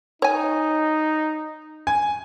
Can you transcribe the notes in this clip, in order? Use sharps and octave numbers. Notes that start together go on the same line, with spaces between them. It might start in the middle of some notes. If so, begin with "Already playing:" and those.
D#4 C#5 G#5
G#5